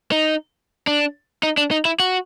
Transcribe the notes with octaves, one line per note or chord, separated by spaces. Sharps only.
D#4
D4
D#4
D4
D#4
E4
F#4